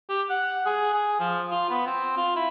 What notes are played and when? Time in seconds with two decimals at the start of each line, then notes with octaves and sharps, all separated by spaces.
0.09 G4
0.30 F#5
0.66 G#4
0.93 G#4
1.20 F3
1.51 F4
1.69 B3
1.86 C4
2.17 F4
2.36 E4